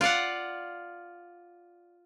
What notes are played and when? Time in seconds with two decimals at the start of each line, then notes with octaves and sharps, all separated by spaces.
0.01 F4 D5 F5 F#5